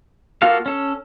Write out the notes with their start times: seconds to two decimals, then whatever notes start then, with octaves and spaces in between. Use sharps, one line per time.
0.42 A#3 F4 F#4 A4 F5
0.66 C#4 A4